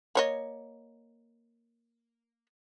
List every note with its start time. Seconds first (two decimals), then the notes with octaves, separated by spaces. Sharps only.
0.15 A#3 C#5 D#5